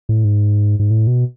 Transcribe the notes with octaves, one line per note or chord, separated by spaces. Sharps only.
A2
G#2
G#2
A2
B2